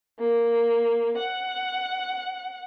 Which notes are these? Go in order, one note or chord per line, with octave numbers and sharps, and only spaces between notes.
A#3
F#5